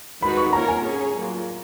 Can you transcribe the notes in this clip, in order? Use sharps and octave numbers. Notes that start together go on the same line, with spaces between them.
D#3 G#3 D#4 F#4 B4 B5
C#6
A#3 F4 A#4 C#5 A#5
G#5
C#4 G#4 C#5
F#3 A#3 F4